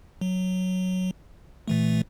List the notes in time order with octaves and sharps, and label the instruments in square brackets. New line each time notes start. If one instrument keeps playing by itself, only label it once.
[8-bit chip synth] F#3
A#2 E3 A3